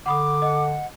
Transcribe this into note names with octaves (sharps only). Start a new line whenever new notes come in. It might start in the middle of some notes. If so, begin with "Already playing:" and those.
D3 F#5 B5 D6 D#6
D#5 F#5